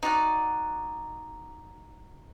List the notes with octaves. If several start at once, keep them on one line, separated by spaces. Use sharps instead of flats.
D#4 F#4 D5 F#5